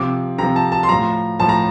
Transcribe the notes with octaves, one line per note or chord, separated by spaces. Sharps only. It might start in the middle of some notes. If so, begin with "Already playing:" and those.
Already playing: C3 F3 D6
C3 F3 A#5
A5
A5
C6
A2 F3 A#5
A2 F3 A5
A#5